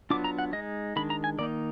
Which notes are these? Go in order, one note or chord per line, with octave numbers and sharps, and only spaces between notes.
F#3 B3 D4 F4 D6
A#5
F#5
G#3 D#4 D#5
D#3 G#3 D4 B5
A#5
G#5
D#3 A#3 D#4 D5